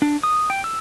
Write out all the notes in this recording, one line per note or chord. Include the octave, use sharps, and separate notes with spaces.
D4
D#6
G5
E6